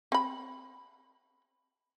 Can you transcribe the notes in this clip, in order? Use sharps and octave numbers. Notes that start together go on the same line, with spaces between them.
C4 B5